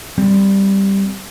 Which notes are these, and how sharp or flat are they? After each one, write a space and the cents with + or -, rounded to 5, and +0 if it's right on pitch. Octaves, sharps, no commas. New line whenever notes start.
G3 +0 C4 +0